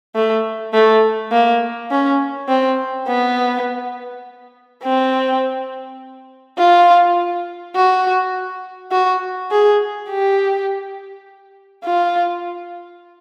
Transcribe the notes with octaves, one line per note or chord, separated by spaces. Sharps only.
A3
A3
A#3
C#4
C4
B3
C4
F4
F#4
F#4
G#4
G4
F4